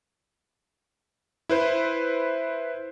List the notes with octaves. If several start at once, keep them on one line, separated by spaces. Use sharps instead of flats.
E4 B4 C5